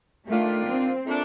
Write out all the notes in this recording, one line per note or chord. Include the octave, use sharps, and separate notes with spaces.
D#3 A3 A#3 D4 F4
C4
A#2 A3 D4